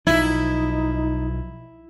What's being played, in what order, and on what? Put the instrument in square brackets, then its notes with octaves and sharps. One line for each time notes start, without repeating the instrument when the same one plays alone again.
[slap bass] B1 F3 [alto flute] D#4 [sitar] E4